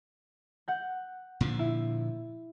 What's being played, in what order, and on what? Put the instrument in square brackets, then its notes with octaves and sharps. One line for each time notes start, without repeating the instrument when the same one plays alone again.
[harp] F#5 G6
[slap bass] A#2 D3 F3
[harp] E4